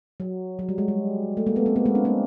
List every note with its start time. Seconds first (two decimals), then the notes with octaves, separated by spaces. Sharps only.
0.20 F#3
0.59 F#3
0.69 G3
0.78 G#3
0.88 G3
1.37 A3
1.47 G#3 A#3
1.56 A3 B3
1.66 A#3 C4
1.76 A3 B3
1.86 G#3 A#3
1.95 C4 D4
2.05 A#3 C4